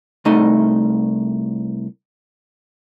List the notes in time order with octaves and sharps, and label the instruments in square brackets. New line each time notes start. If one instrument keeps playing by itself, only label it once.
[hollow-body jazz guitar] C2 A3 D#4 D#5